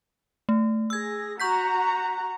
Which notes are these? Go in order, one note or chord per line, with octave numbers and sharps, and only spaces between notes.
A3
G#4 E6 G#6 A#6
F#4 F#5 A#5 C#6 G6 B6